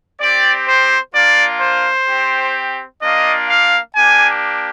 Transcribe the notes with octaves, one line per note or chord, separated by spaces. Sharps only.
C4 G4 D5
C5
A#3 D4 F4 D5
C5
C4 G4
A#3 D4 F4 D#5
F5
A#3 D4 G4 G#5